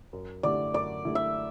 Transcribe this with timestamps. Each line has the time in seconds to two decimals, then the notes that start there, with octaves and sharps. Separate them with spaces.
0.13 F#2
0.43 D3 A3 E4 G4 D5
0.74 F#2 D5
1.05 D3 A3 E4 G4
1.15 E5